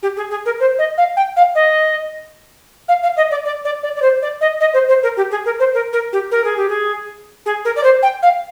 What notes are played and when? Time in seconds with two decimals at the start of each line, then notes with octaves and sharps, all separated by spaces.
0.03 G4
0.17 G#4
0.31 G#4
0.46 A#4
0.60 C5
0.79 D#5
0.98 F5
1.17 G5
1.37 F5
1.55 D#5
2.88 F5
3.03 F5
3.17 D#5
3.31 D5
3.45 D5
3.65 D5
3.83 D5
3.96 D5
4.02 C5
4.22 D5
4.41 D#5
4.60 D#5
4.74 C5
4.89 C5
5.03 A#4
5.17 G4
5.31 G#4
5.46 A#4
5.59 C5
5.74 A#4
5.93 A#4
6.13 G4
6.31 A#4
6.44 G#4
6.57 G4
6.69 G#4
7.46 G#4
7.65 A#4
7.76 D5
7.84 C5
8.03 G5
8.23 F5